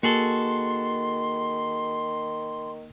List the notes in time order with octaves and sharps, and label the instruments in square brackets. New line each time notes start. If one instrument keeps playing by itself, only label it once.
[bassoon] D#3 [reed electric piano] A#3 [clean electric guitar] F#4 G#4 A4 [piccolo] C6